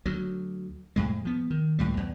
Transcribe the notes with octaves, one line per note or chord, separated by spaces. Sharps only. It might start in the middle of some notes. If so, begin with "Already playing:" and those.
D2 F#3
F2 A2 G#3
F3 B3
D#3
C#2 A2 G3
E2